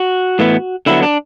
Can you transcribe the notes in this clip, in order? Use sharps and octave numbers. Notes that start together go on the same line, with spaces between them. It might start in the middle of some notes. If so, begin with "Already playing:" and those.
Already playing: F#4
A2 E3 B3
D3 F#3 B3 E4
D4